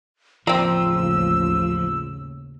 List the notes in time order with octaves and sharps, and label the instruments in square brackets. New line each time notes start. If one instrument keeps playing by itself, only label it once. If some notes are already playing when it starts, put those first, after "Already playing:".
[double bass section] A1 D#2 C#3 [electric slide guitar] F3 [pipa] A#3 C4 [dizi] E6